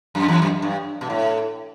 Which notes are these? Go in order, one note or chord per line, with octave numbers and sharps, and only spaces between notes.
F#2
E2
F#2
G2
B2
A2